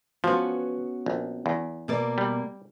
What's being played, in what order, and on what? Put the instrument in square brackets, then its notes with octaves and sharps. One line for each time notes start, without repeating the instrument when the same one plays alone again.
[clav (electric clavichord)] F3 [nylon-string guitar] B3 C#4 F#4
[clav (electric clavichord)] A#1
E2
[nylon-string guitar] B2 A#3 D5
[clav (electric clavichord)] G3